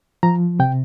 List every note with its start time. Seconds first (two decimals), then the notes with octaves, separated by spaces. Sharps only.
0.23 F3 A#5
0.59 C3 G5